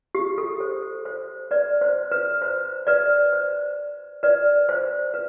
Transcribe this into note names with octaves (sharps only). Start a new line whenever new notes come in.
G4
A4
C5
C5
B4 D5
C5
B4
C5
B4 D5
C5
B4 D5
C5
B4